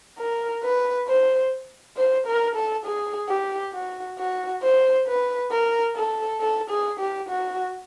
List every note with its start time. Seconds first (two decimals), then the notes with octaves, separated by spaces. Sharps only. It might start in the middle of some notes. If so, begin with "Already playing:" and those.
0.19 A#4
0.63 B4
1.08 C5
1.97 C5
2.27 A#4
2.55 A4
2.86 G#4
3.29 G4
3.73 F#4
4.19 F#4
4.62 C5
5.07 B4
5.51 A#4
5.96 A4
6.41 A4
6.70 G#4
7.00 G4
7.29 F#4